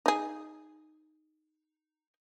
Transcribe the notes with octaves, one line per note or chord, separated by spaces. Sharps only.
D#4 G#4